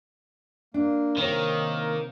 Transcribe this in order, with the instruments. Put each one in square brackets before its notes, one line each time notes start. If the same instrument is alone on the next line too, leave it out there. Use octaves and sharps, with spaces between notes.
[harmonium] A#3 [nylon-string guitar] D4
[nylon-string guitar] C3 C#5 [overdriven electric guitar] D#3